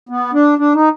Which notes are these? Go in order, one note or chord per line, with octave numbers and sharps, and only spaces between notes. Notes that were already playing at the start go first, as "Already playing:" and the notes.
B3
D4
D4
D#4